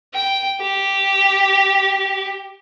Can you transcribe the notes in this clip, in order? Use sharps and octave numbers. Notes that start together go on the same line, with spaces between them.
G5
G4